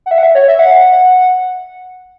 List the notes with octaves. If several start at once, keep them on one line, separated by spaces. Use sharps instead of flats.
F#5
E5
F#5
E5
C#5
E5
F#5